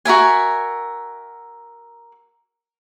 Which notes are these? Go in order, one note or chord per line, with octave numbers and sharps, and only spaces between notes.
F#4 A#4 E5 G#5